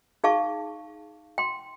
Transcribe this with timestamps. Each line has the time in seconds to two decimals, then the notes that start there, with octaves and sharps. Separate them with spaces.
0.24 D#4 G#4 F5 A5 C#6
1.38 G5 C6